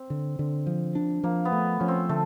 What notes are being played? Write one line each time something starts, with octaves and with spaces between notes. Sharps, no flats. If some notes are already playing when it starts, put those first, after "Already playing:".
Already playing: C4
D3
D3
F3
D4
F3 A#3
B3
A3
F3 C#4
C4
D3 A3